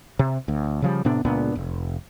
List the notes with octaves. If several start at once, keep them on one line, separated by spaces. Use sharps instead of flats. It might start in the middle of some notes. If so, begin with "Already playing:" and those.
C3
D2
C#3 F3 G3
A2 C3 B3 D4
C#2 A#2 B3 D4
F1